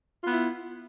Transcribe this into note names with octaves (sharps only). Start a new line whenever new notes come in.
B3 E4 F4